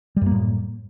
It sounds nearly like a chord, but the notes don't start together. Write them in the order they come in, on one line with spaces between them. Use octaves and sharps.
G3 F#2 A#3 A2